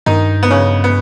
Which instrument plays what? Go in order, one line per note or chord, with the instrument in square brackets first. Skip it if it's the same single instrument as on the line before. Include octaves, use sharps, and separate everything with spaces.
[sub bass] G2 [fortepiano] D#3 D#4
[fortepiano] B3
C#3 C#4
B3